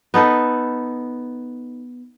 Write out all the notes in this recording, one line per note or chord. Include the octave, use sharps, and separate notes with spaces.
B3 D#4 A4 B4